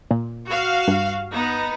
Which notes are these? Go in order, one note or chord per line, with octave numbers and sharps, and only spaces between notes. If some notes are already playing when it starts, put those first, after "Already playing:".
A#2
F#4 F5
G2
B3 D#4